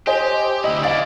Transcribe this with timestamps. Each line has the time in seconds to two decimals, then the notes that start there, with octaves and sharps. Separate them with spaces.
0.07 G4 C5 D#5 G#5
0.64 D2 E4 D#5
0.84 E4 D5 D#5 F5 A6